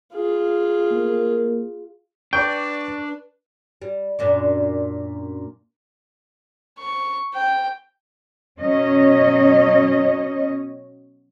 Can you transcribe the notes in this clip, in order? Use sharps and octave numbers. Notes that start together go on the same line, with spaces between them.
F4 G#4
A#3
D4 B4 D5 G5 C#6
G3
F#2 A#2 D4
C#6
G5
B2 F#3 C#4 C#5 D#5